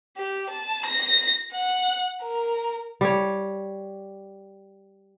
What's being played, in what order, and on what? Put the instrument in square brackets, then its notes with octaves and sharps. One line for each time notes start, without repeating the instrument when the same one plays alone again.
[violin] G4
A5
A#6
F#5
A#4
[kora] G3 C#5